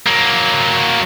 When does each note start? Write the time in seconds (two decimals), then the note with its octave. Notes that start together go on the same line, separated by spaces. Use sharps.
0.07 F#3 A#3